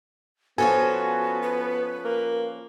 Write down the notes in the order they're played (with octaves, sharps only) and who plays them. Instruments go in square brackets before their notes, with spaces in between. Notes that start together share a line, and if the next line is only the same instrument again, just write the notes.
[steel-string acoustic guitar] F3 C#4 A4 [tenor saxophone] B3 [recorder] F#4 [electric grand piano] G#5
[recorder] B4
[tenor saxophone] A#3